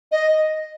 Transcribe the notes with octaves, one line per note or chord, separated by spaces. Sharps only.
D#5